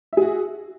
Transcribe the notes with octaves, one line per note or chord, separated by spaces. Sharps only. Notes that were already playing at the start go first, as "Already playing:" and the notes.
F#4 G#4 E5